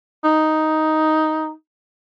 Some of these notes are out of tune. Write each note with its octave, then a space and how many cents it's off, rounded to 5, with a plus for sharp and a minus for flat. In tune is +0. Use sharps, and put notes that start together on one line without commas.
D#4 +5